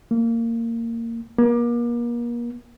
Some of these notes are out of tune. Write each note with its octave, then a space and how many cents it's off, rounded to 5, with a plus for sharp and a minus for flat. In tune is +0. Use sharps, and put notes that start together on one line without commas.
A#3 -20
A#3 +35